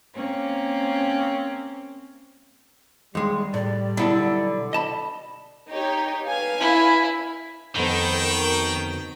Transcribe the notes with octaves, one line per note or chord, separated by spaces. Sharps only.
A#3 C4 C#4
D#2 G3 G#3
A2 D5
B1 D3 E4 A5
D#5 A5 B5
D#4 G4 C#5
B4 F5 G#5
E4
F2 D#3 B3 A4 C5 G5 A5 B5
F#4 A#4